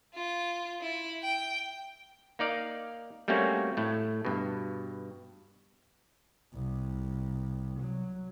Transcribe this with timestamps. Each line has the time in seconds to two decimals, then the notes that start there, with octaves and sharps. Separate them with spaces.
0.14 F4
0.81 E4
1.22 G5
2.39 A#3 D#4 D5 F5
3.28 G3 A3 A#3 C4 C#4 F#4
3.77 A2 A3
4.25 G2 B2
6.54 C2
7.80 F#3